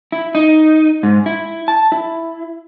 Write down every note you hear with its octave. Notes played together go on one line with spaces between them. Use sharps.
E4
D#4
G#2
E4
A5
E4